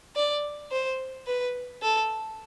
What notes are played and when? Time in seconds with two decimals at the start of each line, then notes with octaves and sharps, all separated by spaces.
0.16 D5
0.72 C5
1.27 B4
1.82 A4